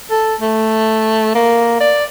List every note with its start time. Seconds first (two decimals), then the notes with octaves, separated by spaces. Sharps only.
0.11 A4
0.41 A3
1.35 A#3
1.81 D5